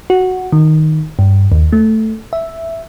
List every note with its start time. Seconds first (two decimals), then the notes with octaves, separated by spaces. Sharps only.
0.10 F#4
0.52 D#3
1.19 G2
1.52 D#2
1.73 A3
2.33 E5